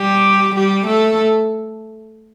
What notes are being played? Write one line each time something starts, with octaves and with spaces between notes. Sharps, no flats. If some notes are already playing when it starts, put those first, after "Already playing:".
Already playing: G3 G4
G3 G4
A3 A4